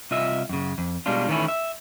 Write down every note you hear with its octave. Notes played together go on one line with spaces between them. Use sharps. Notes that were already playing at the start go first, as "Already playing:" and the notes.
C2 F4 D#5 E5
F#2 C#3
F2
B2 G3 G#3 D4 F4
D#3 E3 A3 C#4 E4
E5